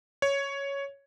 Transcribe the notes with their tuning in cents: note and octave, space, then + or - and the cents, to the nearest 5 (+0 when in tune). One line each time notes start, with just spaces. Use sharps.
C#5 +5